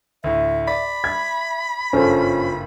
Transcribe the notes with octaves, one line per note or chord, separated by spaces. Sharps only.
D2 A2 E5
D5 B5
E5 G#6
F#1 G2 C#4 F4 A4 C5